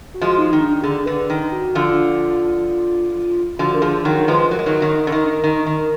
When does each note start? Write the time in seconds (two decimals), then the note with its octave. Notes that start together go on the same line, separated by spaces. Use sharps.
0.14 F#4
0.21 F3 G#3
0.38 D#4
0.53 D#3
0.60 D4
0.83 D3 G#4
1.06 D3 B4
1.30 D#3
1.52 F#4
1.75 D3 F3 F4
3.59 D3 F3 F#4
3.74 A#4
3.82 D3 F3 G#4
4.05 D#3 F#3 A#4
4.28 F3 G#3 B4
4.40 B4
4.51 F#3 A#4
4.59 G#3
4.66 D#3 F#3
4.82 D#3
5.07 D3
5.12 D#3
5.44 D#3
5.66 D#3